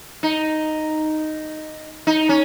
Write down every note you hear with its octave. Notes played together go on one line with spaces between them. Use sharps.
D#4
D#4
C#4